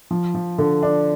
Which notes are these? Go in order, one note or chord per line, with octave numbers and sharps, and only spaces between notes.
F3
F3
D3
D4